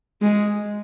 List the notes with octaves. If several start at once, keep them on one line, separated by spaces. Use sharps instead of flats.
G#3